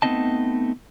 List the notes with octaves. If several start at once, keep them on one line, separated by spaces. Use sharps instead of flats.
A3 B3 C4 D#4 D#5 A5